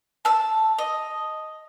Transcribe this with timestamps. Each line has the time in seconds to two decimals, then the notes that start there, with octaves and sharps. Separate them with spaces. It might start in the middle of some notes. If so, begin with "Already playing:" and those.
0.25 A5 E6
0.79 D#5